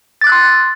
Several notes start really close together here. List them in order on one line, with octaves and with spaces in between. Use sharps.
A6 D6 F#6 E6 C6